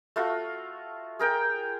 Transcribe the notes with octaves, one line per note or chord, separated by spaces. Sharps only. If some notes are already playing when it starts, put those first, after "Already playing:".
A3 F4 F#4
G#4 A#4 G5